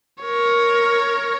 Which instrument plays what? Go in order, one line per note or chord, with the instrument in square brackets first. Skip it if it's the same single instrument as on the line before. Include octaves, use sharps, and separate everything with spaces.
[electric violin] A#4 C#5